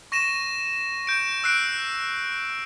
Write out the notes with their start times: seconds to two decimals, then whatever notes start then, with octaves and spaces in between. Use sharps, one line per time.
0.12 C#6 A#6 D#7 E7
1.07 G6 D7
1.44 E6 F#6 C7 D7